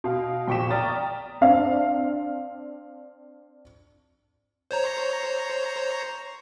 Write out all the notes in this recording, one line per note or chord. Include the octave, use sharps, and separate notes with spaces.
B2 F5
A#1 G5 C#6 D6 B6 E7
D5 G5 A#5 D#6 F6 A6
C4 D4 F5
C5 C#5 A#5